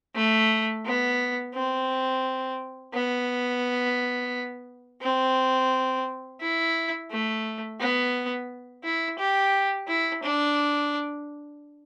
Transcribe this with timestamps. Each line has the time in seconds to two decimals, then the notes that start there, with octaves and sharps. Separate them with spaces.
0.15 A3
0.85 B3
1.54 C4
2.93 B3
5.02 C4
6.41 E4
7.10 A3
7.80 B3
8.83 E4
9.19 G4
9.88 E4
10.23 D4